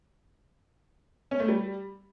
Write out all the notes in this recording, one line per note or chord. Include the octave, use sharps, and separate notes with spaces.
C#4
A3
G3